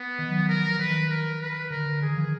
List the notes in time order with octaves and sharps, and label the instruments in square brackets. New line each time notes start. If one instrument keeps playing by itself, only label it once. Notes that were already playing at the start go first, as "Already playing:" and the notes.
Already playing: [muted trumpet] B3
[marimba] D#3
F#3
F3
[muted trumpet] A#4
[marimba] D#3 [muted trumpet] B4
[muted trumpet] A#4
B4
[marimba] D3 [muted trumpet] A#4
[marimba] D3
[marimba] D#3 [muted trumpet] G#4
[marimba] F3